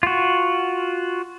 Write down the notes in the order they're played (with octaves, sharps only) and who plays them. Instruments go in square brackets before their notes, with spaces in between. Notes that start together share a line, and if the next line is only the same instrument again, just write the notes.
[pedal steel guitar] F4 F#4